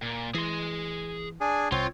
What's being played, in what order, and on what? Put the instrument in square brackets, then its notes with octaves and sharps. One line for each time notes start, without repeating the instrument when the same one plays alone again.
[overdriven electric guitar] A#2
[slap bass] E3 [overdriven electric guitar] G#4 C6
[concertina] D4 G#4 G#5
[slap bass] C2 [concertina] C4 C#5 [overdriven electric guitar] F4